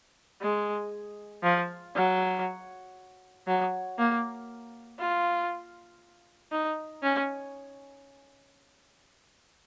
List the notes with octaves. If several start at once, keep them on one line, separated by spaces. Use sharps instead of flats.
G#3
F3
F#3
F#3
A#3
F4
D#4
C#4